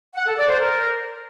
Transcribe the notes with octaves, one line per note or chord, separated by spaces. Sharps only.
F#5
A4
D5
C5
A#4